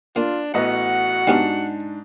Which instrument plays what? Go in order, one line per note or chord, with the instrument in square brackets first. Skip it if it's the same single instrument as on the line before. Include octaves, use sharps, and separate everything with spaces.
[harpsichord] A#3 [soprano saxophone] D4 [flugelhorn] F4
[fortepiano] A1 B3 D#5 [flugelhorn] F#4 [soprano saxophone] F#5
[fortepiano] G#2 D4 [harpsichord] G3 B3 C#4